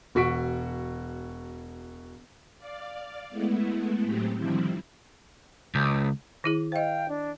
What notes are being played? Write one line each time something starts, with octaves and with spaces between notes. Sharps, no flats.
E1 F#4 C#6 B6 D7
D5 F5
G#3 A3 B3 E4
A2 F#3 G#3 A3 C4 G4
D3 D#3 F3 G3 C4 E4
C#2
D#3 E4 G#4
C5 D#5 F5 G5
D4